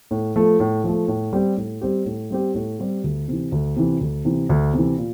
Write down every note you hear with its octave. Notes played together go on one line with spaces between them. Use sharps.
A2
F3 A3
A2
F3 A3
A2
G3 C4 G4
A2
G3 C4 G4
A2
G3 C4 G4
A2
G3 C4 G4
D2
C3 E3
D2
C3 E3
D2
C3 E3
D2
C3 E3
A#2